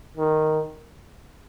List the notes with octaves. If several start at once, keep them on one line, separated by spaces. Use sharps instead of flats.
D#3